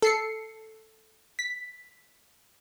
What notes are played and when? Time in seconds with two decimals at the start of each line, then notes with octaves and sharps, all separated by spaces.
0.02 A4 C7 C#7
1.39 B6